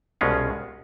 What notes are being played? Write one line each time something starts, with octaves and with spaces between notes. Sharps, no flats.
C2 B2 G#3 C#4 F4